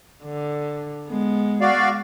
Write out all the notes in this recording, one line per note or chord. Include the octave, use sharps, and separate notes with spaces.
D3
G#3 B3
F#4 D5 F5